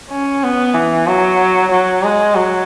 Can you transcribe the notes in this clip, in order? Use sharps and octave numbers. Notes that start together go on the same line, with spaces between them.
C#4
B3
E3
F#3
F#3
G#3
F#3